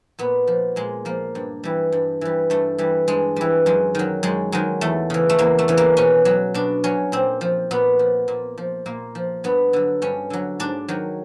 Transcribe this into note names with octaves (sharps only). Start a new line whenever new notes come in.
A#2 B3
F3
A#2 G#3
F3 A#3
G2
E3 G3
G2
E3 G3
G2 A3
E3 G3
G2 G#3
E3 G3
F#2 G#3
D#3 F#3
F#2 G#3
D#3 F#3 G#3
E2 A3
C#3 E3
A3
E2 A#3
A3
C#3 E3
A#3
B2 C#4
F#3
B2 D4
F#3 C#4
A#2 C4
F3
A#2 B3
F3
A#2
F3
A#2 A#3
F3
G2 B3
D3 F#3
G2 C#4
D3 F#3
G#2 D4
D#3 F#3